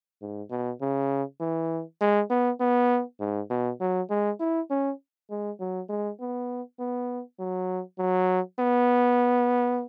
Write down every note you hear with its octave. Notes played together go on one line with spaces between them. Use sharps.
G#2
B2
C#3
E3
G#3
B3
B3
G#2
B2
F#3
G#3
E4
C#4
G#3
F#3
G#3
B3
B3
F#3
F#3
B3